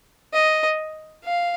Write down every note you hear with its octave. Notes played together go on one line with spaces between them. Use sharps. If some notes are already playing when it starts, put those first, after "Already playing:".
D#5
F5